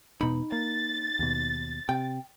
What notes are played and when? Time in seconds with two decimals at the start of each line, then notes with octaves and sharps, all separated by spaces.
0.21 E1 B2 D#4 B5
0.52 A#3 A6
1.19 D#2 B2
1.89 C3 G5